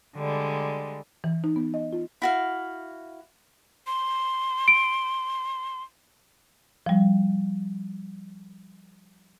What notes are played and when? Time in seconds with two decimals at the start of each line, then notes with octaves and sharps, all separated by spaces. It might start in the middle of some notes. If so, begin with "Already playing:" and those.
0.16 D3 G3 G#3
1.24 E3
1.44 D#4
1.56 B3
1.74 D#5
1.93 F4
2.22 E4 F#4 F5
3.87 C6
4.68 D7
6.86 F3 G3